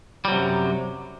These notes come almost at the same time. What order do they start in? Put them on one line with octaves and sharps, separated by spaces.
G3 F#3 C3 F#2